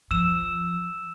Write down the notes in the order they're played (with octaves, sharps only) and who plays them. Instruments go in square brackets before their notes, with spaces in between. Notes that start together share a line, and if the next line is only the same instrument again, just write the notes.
[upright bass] F3 [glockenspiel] E6 E7